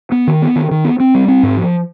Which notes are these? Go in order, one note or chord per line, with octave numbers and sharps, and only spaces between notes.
B3
D#3
B3
D#3
D#3
B3
C4
G3
C4
G#2
F3